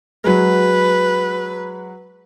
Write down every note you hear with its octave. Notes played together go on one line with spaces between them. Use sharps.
F#3 G#3 B4